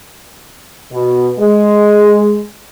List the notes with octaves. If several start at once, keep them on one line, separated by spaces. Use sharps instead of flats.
B2
G#3